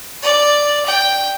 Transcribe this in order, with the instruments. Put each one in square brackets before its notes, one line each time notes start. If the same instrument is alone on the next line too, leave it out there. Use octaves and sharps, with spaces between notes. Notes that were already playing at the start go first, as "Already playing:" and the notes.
[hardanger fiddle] D5
G5